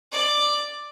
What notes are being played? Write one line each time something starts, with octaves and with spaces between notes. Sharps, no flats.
D5